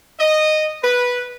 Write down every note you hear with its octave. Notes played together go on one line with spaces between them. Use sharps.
D#5
B4